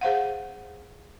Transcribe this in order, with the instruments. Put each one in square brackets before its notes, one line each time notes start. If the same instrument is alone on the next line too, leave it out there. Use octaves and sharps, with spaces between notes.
[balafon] G#4 C5 F5 F#5